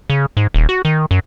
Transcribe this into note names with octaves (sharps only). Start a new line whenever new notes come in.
C#3
G#2
D#1
F#4
D#3
F#2